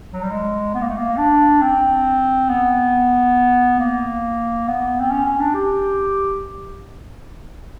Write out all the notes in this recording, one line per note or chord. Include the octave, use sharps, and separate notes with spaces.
F#3
G3
G#3
B3
A#3
A3
A#3
D4
C4
B3
A#3
B3
C4
C#4
C#4
D4
G4